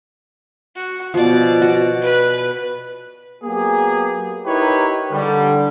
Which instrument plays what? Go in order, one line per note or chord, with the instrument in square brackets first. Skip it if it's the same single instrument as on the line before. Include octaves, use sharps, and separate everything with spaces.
[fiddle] F#4
[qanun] B2 F3 [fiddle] D5
[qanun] F#4
[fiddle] B4
[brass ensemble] F#3 A#3 B3 G4 G#4
D#4 E4 G4 A#4 B4 C#5
D3 G3